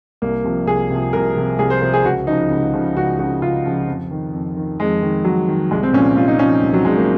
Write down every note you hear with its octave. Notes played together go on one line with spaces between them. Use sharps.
C2 A#3
C3 F3
C2 G#4
C3 F3
C2 A#4
C3 F3
C2 G#4
C5
C3 F3 C5
G#4
C#2 F#4
C#3 F3 D#4
C#2
C#3 F3
C#2 F#4
C#3 F3 F#4
C#2 F4
C#3 F3
F2
D#3
F2
D#3
F2 G#3
D#3
F2 F#3
D#3
C2 G#3
C4
A#2 F3 C#4
C2 F4
D#4
A#2 F3 C#4
C2
F#3
A#2 F3 G#3
A#3